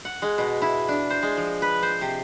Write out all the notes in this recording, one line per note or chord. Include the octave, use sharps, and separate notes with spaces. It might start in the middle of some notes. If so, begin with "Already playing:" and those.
F#5
G#3
B2
E4
D4
C5
G#3
F3
B4
C5
C3